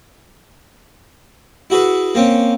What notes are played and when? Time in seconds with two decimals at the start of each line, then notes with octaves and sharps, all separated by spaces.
1.70 E4 F#4 G#4 B4
2.15 A#3 C4 C#4